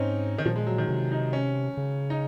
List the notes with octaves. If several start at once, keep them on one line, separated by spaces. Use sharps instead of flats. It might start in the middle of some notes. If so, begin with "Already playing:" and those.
Already playing: G#2 C4 C#4 D#4
D#3
A#2 F3
G#3
F#3
D#3
C3
D#4
C#4
C#3
D#4